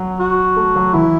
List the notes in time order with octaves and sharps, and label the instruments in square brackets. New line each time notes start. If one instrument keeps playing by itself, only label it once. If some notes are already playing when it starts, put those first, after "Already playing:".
Already playing: [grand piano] F#3
[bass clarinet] F#4
[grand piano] A3
F#3
[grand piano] E3 [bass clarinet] E4